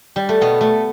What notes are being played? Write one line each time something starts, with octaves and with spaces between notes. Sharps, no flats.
G3
A3
B2 B3
A3